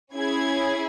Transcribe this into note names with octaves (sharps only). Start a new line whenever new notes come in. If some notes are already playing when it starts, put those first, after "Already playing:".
C#4 E4 G#4 G#6